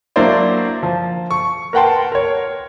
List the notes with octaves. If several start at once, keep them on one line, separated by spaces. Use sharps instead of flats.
F#3 A#3 D4 E4 C5 D5
F3
C#6
A#4 B4 F#5 G5 A5 C6
A#4 C#5